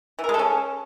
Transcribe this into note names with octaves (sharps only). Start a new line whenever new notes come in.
E3
A#4
G#3
A4
C#4